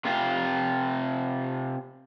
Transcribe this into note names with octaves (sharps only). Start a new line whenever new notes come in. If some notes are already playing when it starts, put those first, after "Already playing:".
C3 F4